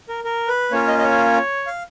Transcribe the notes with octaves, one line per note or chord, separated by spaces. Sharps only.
A#4
A#4
B4
A#3 C#4 F4 C#5
D#5
D#5
C#5
F5